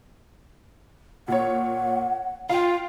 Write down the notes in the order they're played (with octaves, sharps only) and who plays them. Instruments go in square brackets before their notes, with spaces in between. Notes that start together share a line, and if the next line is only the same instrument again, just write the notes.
[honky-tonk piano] A#2 C#5 [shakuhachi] F#5
[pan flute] F4 [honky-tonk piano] F5 G5